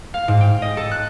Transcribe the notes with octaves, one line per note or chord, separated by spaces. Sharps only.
F5
G#2
G5
D#5
A4
F#6